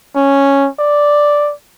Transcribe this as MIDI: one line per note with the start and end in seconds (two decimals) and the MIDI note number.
0.16 0.68 61
0.79 1.52 74